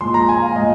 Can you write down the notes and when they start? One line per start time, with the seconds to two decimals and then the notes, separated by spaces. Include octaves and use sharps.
0.01 A#2 F3 G#3 C6
0.14 A#5
0.29 G#5
0.42 F5
0.56 A#2 G#3 D#5